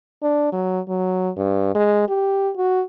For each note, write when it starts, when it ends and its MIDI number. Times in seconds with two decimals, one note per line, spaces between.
0.23 0.50 62
0.52 0.80 54
0.89 1.30 54
1.37 1.71 43
1.75 2.04 56
2.09 2.51 67
2.56 2.83 66